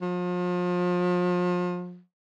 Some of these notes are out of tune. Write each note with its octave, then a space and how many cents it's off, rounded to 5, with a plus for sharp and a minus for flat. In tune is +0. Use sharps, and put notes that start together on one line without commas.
F3 +35